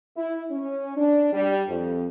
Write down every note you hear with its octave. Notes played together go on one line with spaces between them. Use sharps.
E4
C#4
D4
G3
F2